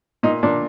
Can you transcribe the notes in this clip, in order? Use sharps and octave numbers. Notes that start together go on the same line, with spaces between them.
A#2 D#4
A#2 D4